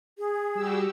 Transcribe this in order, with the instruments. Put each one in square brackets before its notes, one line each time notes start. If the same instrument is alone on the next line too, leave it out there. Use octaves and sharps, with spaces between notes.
[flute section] G#4
[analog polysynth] G3 [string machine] F#4 G4 E6